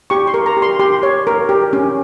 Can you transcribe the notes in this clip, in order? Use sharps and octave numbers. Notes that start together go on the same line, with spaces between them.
G4 C#6
C6
A#4
A#5
G4
C6
G4 C6
C#5
A#4
G4
C#4